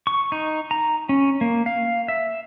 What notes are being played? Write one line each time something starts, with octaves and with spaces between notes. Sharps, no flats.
C#6
D#4
A#5
C#4
A#3
F5
E5